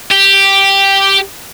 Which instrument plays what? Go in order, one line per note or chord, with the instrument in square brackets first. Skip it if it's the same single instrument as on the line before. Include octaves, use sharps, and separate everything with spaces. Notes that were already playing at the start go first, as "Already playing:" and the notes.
[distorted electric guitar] G4